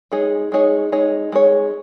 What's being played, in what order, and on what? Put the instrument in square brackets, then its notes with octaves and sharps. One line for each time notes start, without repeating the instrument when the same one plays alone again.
[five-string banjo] G#3 D#4 G#4 C#5
G#3 D#4 G#4 C#5
G#3 D#4 G#4 C#5
G#3 D#4 G#4 C#5